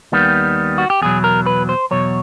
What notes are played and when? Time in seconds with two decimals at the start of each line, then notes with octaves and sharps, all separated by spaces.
0.12 D#2 D#3 G3 B3
0.78 F#4
0.90 G4
1.02 E2 B2 F#3 G#4
1.24 A#4
1.46 B4
1.69 C5
1.91 E2 B2 F#3 C#5